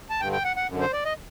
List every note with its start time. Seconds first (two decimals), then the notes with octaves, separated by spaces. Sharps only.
0.10 A5
0.20 G2 G5
0.24 D3
0.32 G5
0.44 F#5
0.56 F#5
0.68 F#2 D3
0.81 C5
0.93 D5
1.05 D#5